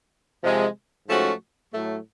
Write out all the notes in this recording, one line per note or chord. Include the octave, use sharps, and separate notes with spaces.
C3 F3 G#3
G#2 F3 A3 C#4 F#4
A2 F#3 A3